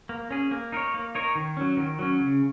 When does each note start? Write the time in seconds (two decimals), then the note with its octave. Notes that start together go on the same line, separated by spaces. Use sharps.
0.09 A#3
0.31 C#4 G#4
0.51 A#3
0.72 D#4 A#4 C#5
0.94 A#3
1.15 D#4 A#4 C#5
1.35 D#3
1.57 F#3 C#4
1.77 D#3
1.99 F#3 C#4
2.20 C#3